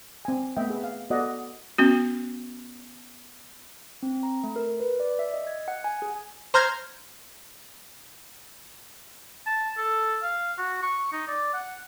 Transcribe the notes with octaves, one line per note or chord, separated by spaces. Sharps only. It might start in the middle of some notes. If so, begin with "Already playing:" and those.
C4 G#5
A3 B3 D#5 E5 G5
G#4 B4
F5
B3 F#4 A4 D5 D#5 F#5
B3 C#4 F#4
C4
A#5
A3
A#4
B4
D5
E5
D#5
G#6
F#5
G#5
G#4
C5 A#5 F6 G6 G#6 A#6
A5
A4
F5
F#4
C#6
D#4
D5
F#5